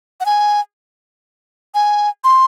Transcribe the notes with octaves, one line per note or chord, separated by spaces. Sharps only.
F#5
G#5
G#5
C6